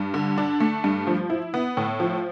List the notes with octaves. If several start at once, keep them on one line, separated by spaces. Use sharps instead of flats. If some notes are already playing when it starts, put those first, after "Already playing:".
Already playing: G2
D3
D4
A3
G2
F3
E4
B3
A2
F3